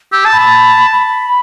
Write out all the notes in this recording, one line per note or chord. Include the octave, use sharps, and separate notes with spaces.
G4 E6
A5
B5
A5
B5